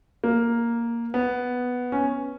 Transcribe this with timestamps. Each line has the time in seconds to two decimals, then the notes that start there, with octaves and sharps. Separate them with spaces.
0.24 A#3
1.14 B3
1.92 C#4